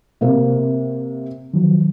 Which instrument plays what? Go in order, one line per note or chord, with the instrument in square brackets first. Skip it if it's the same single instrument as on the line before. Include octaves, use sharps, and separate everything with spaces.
[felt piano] C3 A#3 C4
[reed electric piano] D#3 F3 F#3